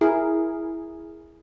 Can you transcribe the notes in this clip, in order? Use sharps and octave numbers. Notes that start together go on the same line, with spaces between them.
E4 G#4 A#4